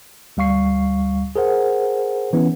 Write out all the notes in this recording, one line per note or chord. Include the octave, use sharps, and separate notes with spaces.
D2 G3 F5 C#6 C7
G#4 A#4 C5 F#5
E3 B3 C#4 E4